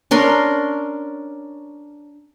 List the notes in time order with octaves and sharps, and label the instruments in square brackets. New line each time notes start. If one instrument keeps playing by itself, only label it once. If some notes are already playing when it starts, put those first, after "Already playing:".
[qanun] C#4 D4 A#4 C6